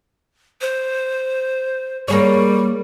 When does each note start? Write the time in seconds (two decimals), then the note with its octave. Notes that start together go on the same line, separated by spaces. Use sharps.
0.61 C5
2.08 G3 A#3 G#4 C#5